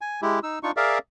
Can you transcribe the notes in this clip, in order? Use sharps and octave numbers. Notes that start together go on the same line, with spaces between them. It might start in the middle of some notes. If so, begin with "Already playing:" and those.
G#5
G#3 E4 G4
D#4 E6
D4 D#4 F4 C#6
G#4 A#4 D5 E5 F5